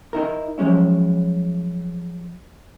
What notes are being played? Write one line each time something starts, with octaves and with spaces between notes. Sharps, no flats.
D#4 E4 A#4
F3 F#3 G#3 C#4 E4